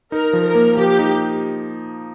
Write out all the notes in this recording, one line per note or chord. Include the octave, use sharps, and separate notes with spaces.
D#4 A#4
F3
A#4
A#3
F3 G4
D#4